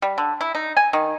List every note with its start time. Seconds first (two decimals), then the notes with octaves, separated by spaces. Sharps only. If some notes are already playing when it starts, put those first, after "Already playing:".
0.02 G3
0.18 D3
0.41 E4
0.55 D#4
0.77 G#5
0.93 D#3